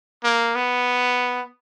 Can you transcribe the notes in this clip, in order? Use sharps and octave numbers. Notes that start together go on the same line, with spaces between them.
A#3
B3